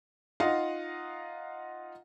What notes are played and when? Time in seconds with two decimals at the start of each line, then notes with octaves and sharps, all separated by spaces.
0.40 D#4 F4 D#5 F5 F#5